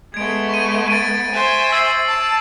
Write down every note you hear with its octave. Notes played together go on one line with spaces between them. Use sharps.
G#3 A3 B3 G#6 D7
C#6 D#7
A6 D7 D#7
C5 E5 G#5
E6 A6 C7
A5 C7